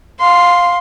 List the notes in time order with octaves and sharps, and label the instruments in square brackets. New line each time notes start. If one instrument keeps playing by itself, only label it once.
[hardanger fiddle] F5 C6